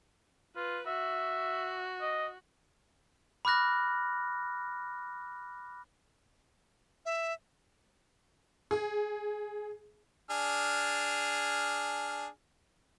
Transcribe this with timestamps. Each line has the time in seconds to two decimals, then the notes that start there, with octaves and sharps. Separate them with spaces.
0.56 F4 B4
0.87 F#4 E5
2.01 D#5
3.45 B5 D6 F6 F#6 A#6
7.06 E5
8.71 G#4
10.30 D4 G#4 F6